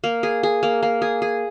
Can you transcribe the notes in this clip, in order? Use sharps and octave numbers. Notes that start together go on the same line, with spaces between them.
A#3
G#4
G#4
A#3
A#3
G#4
G#4